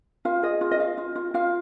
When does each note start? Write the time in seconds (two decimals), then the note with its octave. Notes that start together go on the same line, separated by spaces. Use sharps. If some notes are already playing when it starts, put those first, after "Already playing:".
0.25 F4 F5
0.43 G#4 D#5
0.61 F4
0.71 D#5
0.79 F4 F5
0.98 F4
1.16 F4
1.34 F4 F5